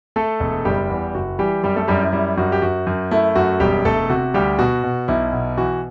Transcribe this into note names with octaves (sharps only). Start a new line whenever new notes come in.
A3 A4
E1
F#1 G3 G4
E2
F#1 F#4
E3 G3 G4
F#2 G3 G4
A3 A4
F#2 G3 G4
E4
G3 E4
F#2 F#4
G4
F#2 F#4
F#2
A3 E4
F#2 F#4
E1 G3 G4
E1 A3 A4
C3 F#4
D2 G3 G4
B2 F#4
B2
B1 E4
B2
E3 F#4